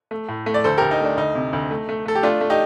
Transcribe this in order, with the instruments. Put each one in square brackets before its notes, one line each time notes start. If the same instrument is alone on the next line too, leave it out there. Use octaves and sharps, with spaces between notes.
[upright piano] A3
A2
A3
D5
D2 A4 C5
D2 G4 A#4
D#4
A3 D4
D2 D#4
C3
D2
A3
A3
A3 A4
G4
A3 D4 F4
A3
D#4 G4